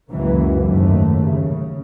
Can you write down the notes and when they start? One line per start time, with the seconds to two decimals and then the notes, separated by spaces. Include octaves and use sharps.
0.12 C#2 F#2 E3 F#3 A#3
0.61 F#1 D#2 G#2 A3
1.24 C#3